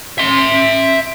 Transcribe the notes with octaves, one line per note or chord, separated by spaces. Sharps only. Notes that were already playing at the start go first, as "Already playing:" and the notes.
E5 C6